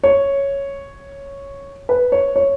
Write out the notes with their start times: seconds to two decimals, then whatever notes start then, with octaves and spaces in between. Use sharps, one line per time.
0.04 C#5
1.89 B4
2.12 C#5
2.36 C#5